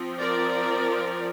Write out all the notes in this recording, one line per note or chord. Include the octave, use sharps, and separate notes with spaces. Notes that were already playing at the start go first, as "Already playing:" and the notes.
Already playing: F3 C4
A#4 D5